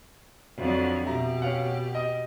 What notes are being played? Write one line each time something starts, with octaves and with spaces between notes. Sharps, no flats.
F2 D3 F#3
B2 G4 E5 A#5
C#4 F5 F#5
D#5